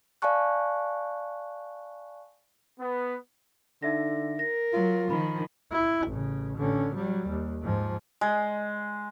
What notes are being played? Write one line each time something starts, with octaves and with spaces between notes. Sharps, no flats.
D5 F5 G#5 A5 C#6 F#6
B3
D3 D#4 E5 A#6
A#4 A#6
F#3 F4
D#3 F3 B5
E4
A1 C#3
D3 C#4
F#3 G3
D#2
G#2 F3
G#3